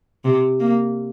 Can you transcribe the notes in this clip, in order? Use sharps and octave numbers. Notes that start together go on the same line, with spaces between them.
C3
A#3